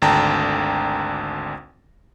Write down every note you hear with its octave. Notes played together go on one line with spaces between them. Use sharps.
G#1 D2 D3 G5 A5 A#5